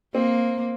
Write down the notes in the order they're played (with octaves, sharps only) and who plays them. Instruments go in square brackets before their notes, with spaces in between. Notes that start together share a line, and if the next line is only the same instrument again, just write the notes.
[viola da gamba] A#3 [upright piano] C4